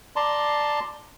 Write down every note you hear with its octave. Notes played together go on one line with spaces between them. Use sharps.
D5 A5 A#5 C6